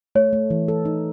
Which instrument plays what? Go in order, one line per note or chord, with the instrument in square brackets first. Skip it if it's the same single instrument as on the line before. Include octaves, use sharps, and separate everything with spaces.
[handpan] A3 [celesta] C#5
[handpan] A3
E3
A4
D#4